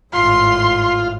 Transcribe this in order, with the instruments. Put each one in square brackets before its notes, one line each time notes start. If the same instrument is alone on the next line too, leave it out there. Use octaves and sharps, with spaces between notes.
[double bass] G#1 A2 [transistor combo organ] F4 [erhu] C6